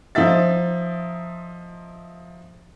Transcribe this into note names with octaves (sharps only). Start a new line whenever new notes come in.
F3 D#4 F4 E5 A6